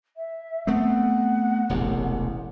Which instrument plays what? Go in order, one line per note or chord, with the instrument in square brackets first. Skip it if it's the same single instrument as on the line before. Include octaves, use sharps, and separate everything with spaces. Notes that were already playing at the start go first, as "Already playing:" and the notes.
[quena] E5
[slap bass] A3 B3 C4 [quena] F#5
[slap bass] E1 A1 C3